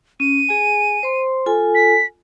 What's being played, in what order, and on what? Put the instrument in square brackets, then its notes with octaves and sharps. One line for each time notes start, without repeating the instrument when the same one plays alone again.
[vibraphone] C#4 [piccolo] D#7
[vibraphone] G#4 G#5
C5 C6
F4 A4 G#5
[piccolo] B6